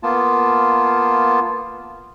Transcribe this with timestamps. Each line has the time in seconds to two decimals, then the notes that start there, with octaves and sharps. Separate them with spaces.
0.03 A#3 B3 F4 A5